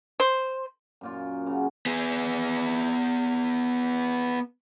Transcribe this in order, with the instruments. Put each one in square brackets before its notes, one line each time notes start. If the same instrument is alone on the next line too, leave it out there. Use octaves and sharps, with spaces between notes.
[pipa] C5
[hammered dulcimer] F#2 A#2 F4
C#3 F#3
[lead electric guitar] B3 G#4